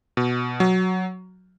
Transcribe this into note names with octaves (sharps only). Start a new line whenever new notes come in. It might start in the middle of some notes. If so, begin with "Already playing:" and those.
B2
F#3